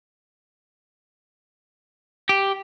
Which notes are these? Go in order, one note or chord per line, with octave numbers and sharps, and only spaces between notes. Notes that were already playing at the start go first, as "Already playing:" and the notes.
G4